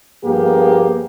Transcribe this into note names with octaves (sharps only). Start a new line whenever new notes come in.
G2 F3 A#3 B3 G4 G#4